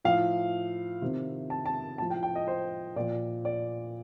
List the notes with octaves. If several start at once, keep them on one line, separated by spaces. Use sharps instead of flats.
A2 F3 F5
C3 D#3
A5
A5
A2 F3 A5
G5
G5
D#5
C5
A#2 F3 D5
D5